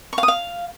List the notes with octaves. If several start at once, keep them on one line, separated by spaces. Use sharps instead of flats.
C#6
F5
D#6
F5